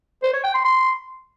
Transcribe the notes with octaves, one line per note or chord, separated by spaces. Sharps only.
C5
C#5
G5
C6
C6